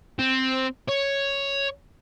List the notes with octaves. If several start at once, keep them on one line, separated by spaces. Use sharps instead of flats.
C4
C#5